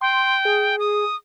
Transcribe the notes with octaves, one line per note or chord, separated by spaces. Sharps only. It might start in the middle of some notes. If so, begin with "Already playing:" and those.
G5 C6
G#4
D#6